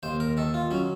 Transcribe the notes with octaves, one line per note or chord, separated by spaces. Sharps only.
D#2 C5
A#4
D#3 A4
F4
F#3 C#4